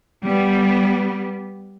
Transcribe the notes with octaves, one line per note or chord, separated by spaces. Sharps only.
G3 B3